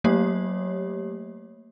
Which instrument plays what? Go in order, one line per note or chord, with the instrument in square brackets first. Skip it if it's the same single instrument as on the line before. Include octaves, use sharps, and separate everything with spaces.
[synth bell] F#3 A3 A#3 G4 C#5